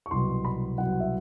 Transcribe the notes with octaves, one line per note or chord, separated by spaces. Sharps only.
C#6
C2 B2 F#3 C6
B5
C2 B2 F#3 F#5
E5